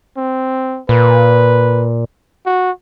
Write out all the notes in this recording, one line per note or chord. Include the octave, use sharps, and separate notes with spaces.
C4
A#2 B4
F#4